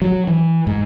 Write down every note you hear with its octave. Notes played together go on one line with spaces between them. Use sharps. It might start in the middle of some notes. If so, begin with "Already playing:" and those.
F#3
E3
G#2